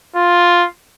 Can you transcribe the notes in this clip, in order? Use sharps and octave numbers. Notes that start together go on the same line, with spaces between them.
F4